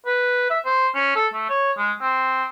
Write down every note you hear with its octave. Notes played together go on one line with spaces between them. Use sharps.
B4
E5
C5
C#4
A4
A3
C#5
G#3
C4